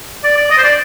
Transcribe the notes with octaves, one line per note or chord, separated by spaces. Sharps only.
D5
D5
D#5
C5
D5